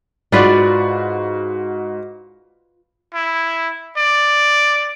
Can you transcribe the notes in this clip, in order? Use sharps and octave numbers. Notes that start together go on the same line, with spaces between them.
G#2 F4 F#4 B4 D5
E4
D5